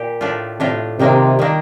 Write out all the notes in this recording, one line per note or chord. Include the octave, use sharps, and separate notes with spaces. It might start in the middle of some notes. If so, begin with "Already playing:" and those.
Already playing: A#2 G4
A2 A3 D4 F4
A2 C3 A3 D4 F4
C3 D#3 G3 A#3 D4
D#3 G3 A#3 D4